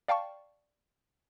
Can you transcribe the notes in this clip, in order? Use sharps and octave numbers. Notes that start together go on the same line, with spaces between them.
D5 F5 G5 A5 C#6